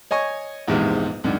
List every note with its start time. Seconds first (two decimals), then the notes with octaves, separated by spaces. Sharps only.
0.11 C#5 D#5 G#5 C#6
0.68 A#1 E2 G#2 C3
1.24 C#2 F#2 D#3 D4